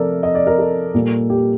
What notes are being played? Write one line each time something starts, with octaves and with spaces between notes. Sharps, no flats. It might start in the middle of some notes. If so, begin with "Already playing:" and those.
Already playing: C3 F3 A3 A4 A#4 D5
D#5
D5
A#4
A4
A#2 G3 A#3
G4